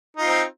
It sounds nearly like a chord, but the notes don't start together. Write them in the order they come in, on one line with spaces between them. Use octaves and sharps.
D#4 F4 C4